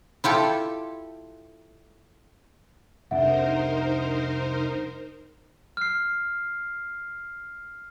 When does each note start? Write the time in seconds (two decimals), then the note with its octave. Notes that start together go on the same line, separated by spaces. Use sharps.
0.24 E4 F4 G4 A4
3.11 C2 F2 D4 D#4 A#4 C5 E5 F#5
5.77 F6 C7